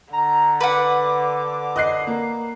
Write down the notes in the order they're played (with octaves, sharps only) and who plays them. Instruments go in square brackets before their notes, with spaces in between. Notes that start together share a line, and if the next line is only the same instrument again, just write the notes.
[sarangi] D3 [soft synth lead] A#5
[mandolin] B4 F#5 [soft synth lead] D6
[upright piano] D#5 F#6 C7
A#3